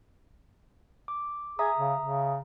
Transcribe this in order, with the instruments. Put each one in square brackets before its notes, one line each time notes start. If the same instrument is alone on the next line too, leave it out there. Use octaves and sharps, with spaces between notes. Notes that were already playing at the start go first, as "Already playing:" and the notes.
[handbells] D6
[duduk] G#4 [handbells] E5 A#5 D#6
[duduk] C#3
C#3